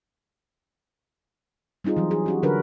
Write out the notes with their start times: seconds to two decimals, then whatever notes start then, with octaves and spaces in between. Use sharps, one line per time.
1.84 G3 C4 D#4 F4 G#4
1.97 E3 F#3
2.11 G#4
2.26 C#4 F#4 G4
2.43 D3 F#3 D4 F#4 A#4 B4